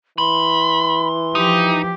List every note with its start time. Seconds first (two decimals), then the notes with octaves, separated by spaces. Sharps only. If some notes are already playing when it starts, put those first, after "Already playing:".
0.18 E3 B5 C6
1.35 F3 D#4 G4